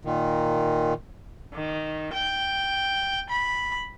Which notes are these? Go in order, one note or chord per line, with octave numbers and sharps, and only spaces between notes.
A#2 D#3
D#3
G5
B5